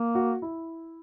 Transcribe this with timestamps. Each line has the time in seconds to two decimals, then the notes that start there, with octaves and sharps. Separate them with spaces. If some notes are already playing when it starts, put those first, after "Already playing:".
Already playing: A#3
0.15 F#4
0.42 E4